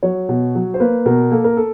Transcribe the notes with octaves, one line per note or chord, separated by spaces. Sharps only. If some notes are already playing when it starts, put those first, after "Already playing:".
F#3 C#5
B2
F#3
C5
A#3 B4
B2 A#4
A#3 A4
A#4
A4